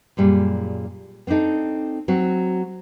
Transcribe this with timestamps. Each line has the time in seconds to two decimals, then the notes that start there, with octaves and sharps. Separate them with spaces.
0.17 F#2 A#2 G3 G#4
1.27 B3 C4 D4 D#4 A4
2.08 F#3 C4 F#4